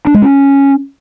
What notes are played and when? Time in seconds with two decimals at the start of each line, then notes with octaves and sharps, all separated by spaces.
0.07 D4
0.14 G#3
0.22 C#4